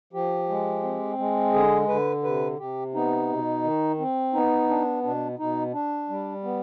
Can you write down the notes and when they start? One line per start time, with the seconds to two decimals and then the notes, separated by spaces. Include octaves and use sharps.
0.13 F3 G4
0.49 G#3
0.83 C4
1.18 G#3
1.53 D3 G#4
1.88 D3 B4
2.23 C3 B4
2.59 C3 G4
2.94 B3 D#4
3.29 B2
3.63 D#3
3.99 C4
4.34 B3 D#4
4.69 D4
5.04 B2 D4
5.39 B2 D#4
5.73 D4
6.09 G3
6.44 B3